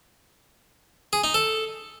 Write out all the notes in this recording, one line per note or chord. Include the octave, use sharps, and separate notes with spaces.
G#4
D#4
A4